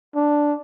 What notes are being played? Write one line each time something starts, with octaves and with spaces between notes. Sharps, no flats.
D4